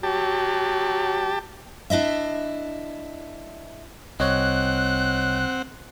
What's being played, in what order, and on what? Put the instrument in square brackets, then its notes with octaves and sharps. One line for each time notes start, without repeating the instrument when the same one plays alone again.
[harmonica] F#3 [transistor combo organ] G4 A5
[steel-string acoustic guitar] D4 E4 D#5 E5
[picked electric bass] C2 [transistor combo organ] C4 F#5 [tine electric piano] C#5 D#5 [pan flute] F#6